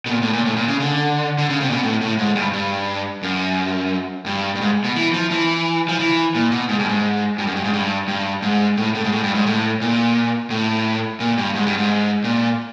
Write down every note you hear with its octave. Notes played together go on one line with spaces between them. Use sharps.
B2
A#2
A2
A#2
A2
A#2
C#3
D3
D3
C#3
C3
A#2
B2
A2
A2
G#2
G2
G2
F#2
G2
G2
G#2
B2
E3
F3
E3
F3
E3
A#2
B2
G#2
G2
G#2
G2
F#2
G2
G#2
G2
G2
G#2
A2
A2
G#2
A2
G2
G#2
A2
A#2
A2
A#2
G2
G#2
G2
G#2
A#2